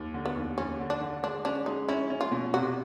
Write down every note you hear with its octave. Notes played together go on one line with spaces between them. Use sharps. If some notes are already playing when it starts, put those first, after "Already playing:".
Already playing: D#2
D3
B3
D#2
D#2 C#4
D3
D4
D3
G#3 D4
C#4 D4
G#3 D#4
C#4 E4
C#4
F4
B2
C3 F#4